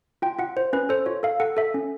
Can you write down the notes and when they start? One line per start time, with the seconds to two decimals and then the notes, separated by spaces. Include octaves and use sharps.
0.22 F4 G5
0.39 F4 F#5
0.56 F4 C5
0.73 C#4 B4
0.89 A4 C5
1.06 F4 C#5
1.23 A4 F5
1.40 A4 F#5
1.57 A4 E5
1.74 C#4